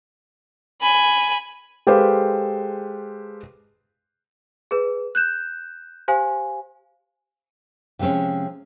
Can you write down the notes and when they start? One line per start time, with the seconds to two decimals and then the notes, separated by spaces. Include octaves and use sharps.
0.81 G#5 B5
1.87 G#3 G4 A4 B4 C5 F5
4.71 G#4 B4
5.15 F#6 G6 E7
6.08 G4 C5 F5 G#5
7.99 C3 F3 G#3 C4 C#4